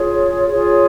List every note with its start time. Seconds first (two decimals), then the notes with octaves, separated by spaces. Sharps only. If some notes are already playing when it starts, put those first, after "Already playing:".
Already playing: F4 G#4 C#5
0.49 F4 G#4 C#5